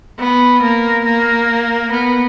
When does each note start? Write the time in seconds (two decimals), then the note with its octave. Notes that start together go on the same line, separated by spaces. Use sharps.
0.19 B3
0.62 A#3
1.05 A#3
1.91 B3